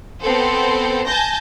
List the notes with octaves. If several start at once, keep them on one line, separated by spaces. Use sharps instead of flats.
B3 C4 A4 C5
G#5 A5 G6 A#6